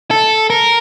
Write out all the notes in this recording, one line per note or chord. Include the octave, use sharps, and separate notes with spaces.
A4
A#4